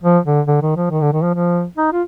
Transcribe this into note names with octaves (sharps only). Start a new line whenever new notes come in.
F3
D3
D3
D#3
F3
D#3
D3
D#3
F3
F3
D#4
F4